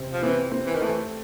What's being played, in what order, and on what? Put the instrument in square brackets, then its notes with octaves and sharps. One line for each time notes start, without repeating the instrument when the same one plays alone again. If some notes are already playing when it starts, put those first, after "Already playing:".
Already playing: [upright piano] C3 C4
[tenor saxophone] F3
[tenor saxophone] E3 [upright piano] C4
[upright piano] C4
[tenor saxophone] E3
D#3
[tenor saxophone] E3 [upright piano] A3